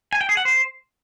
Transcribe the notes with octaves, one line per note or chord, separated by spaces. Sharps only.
G#5
G5
G#4
F#5
C5